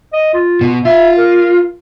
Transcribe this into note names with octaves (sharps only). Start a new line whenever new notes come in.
D#5
F4
B2
F4 E5
A#4